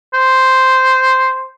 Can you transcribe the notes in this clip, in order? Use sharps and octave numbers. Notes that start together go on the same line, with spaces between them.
C5